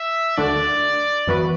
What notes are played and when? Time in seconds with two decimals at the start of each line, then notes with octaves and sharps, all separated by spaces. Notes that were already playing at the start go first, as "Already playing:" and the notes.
Already playing: E5
0.37 D2 D3 A3 D4 F#4 D5
1.27 F#2 E3 B3 F#4 B4